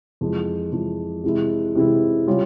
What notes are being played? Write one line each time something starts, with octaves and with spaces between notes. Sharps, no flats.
F2 E3 G#3
F2 E3 G#3
C3 E3 G#3 E4
C3 E3 G#3 E4
C#3 G3 C#4 F4 G#4